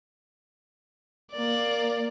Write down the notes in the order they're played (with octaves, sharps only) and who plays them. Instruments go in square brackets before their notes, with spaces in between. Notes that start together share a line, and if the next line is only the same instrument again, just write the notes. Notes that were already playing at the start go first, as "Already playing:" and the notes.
[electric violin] A#3 D5